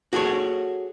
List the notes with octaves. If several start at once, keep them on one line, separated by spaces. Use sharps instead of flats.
F#4 G#4 A4 C#5